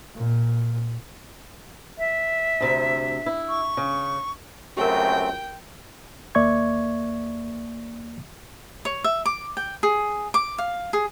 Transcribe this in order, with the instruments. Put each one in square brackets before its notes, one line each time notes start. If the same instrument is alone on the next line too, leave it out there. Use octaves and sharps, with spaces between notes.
[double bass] A#2
[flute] E5
[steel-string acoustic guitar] D2 C3
E4
[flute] C#6
[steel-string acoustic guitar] C#3
[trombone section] C#2 F#2 [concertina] A3 C4 [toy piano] G4 A#4 [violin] G5
[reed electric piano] D#2 A#3 D5 E5 C#6 G#6
[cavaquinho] C#5
E5
D6
G5
G#4
D6
F5
G#4